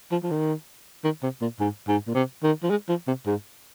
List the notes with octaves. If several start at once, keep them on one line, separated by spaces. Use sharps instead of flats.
F3
F3
D#3
D#3
C3
A#2
G#2
G#2
A#2
C3
D#3
F3
G#3
F3
C3
G#2